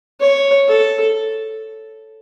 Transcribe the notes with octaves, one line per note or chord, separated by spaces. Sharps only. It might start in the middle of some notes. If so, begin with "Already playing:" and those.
C#5
A4